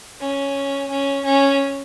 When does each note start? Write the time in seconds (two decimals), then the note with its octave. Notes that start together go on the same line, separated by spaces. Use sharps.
0.20 C#4
0.90 C#4
1.25 C#4